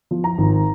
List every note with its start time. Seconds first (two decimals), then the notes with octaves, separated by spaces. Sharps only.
0.11 F3
0.24 A#5
0.38 G#1